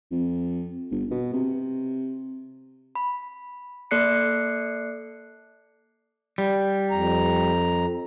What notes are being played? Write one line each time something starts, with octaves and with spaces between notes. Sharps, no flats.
F2
G1
B2
C3
B5
A#3 A4 D5 F#6 C7 C#7
G3
F2 A#5